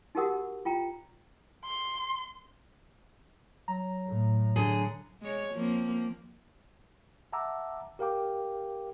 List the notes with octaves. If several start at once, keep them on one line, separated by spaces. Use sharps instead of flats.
D#4 F#4 G4 A#4 F#5 D#6
F4 G5 A#5
C6
F#3 A#5
A2
D3 G#4
G#3 C#5
F3 A#3 C4
E5 F#5 A5 A#5 D6 E6
G4 A#4 F5 G5 D6